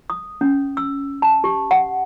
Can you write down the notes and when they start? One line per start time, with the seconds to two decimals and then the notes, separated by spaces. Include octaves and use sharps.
0.10 D#6
0.41 C#4
0.77 E6
1.22 A5
1.44 G4
1.71 F#5